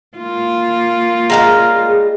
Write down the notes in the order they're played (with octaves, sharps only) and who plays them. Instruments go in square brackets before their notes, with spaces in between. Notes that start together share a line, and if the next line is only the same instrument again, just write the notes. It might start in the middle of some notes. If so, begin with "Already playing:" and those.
[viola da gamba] A#3 F4
[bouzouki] C#3 G3 G#3 [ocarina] G#4 [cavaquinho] A#4 F5 A#5